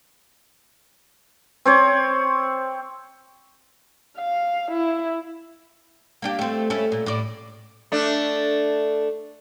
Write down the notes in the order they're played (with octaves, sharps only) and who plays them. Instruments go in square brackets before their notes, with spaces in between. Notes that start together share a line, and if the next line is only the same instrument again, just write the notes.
[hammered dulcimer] C4 C5 C#5
[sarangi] F5
E4
[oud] A#3 D4 G4
A3 C4
A3 C#4 E4
A#2
A2 D5
[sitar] A3 D4